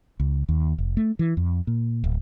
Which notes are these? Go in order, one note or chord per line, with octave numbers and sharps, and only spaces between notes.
C#2
D#2
F1
A3
E3
F2
A#2
D1